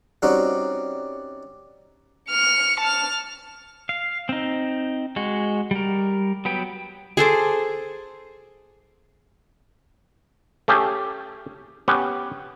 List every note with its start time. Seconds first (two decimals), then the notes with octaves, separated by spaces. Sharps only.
0.22 G3 C4 C#4 D#4 F#4 G4
2.29 F6 C#7
2.80 A5 F6
3.89 F5
4.29 C4 D#4
5.16 G#3 F#4
5.71 G3 A#4
6.45 F#3 B3 B4 G5
7.17 G#4 A4 C5 D6
10.68 A3 C#4 G4 G#4
11.88 B3 C#4 G4